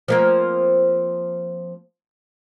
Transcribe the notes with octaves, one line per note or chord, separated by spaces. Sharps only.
F3 A#3 C4